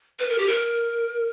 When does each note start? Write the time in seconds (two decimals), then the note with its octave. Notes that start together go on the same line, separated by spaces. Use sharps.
0.19 B4
0.29 A#4
0.38 G4
0.48 A#4